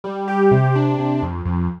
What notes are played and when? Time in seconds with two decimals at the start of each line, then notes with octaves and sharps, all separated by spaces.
0.04 G3
0.28 G4
0.51 C3
0.75 D4
0.98 C3
1.22 F2
1.45 F2